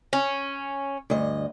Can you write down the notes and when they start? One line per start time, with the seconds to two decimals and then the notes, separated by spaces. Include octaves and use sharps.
0.13 C#4
1.10 D2 G2 D#5